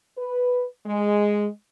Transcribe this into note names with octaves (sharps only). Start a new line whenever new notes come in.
B4
G#3